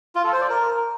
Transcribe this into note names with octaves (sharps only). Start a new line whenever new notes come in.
F4
A4
C5
D5
A#4